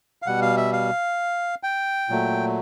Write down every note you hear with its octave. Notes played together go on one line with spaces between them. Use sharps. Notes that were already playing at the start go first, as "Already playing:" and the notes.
F5
B2 G3 F#5
F5
E5
F5
G5
A#2 F#3 A3